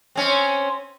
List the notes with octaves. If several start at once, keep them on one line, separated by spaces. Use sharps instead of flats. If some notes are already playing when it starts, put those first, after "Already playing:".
C4 C#4